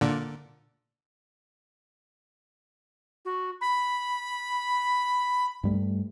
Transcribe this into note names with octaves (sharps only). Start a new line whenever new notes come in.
A#2 D3
F#4
B5
G2 G3 A3